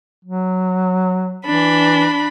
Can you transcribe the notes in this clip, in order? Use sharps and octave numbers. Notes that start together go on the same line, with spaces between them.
F#3
E3 D4 B5